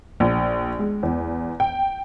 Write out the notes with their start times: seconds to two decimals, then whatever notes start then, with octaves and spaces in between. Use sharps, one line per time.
0.20 A#1
0.79 G#3
1.03 E2
1.60 G5